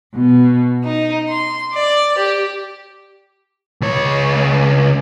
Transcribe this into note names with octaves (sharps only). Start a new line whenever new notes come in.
B2
D#4
C6
D5
G4
C#2 C#5